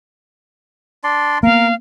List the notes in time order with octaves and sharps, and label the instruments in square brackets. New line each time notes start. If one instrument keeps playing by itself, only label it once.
[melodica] D4 D5 C6
[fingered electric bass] A#3 B3 [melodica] A#4 [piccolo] F5